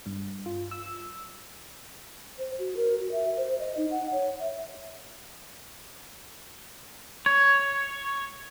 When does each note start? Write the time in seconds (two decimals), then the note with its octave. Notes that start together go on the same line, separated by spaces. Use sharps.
0.06 G2
0.46 F4
0.71 E6
2.39 C5
2.59 F#4
2.77 A#4
2.99 F#4
3.12 E5
3.37 C5
3.59 D#5
3.77 D#4
3.91 F#5
4.12 C#5
4.40 E5
7.26 C#5